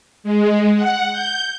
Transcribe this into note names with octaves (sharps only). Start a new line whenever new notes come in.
G#3
F#5
G6